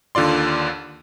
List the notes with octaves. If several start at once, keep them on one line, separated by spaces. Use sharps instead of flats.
D#2 D3 F4 D5 C6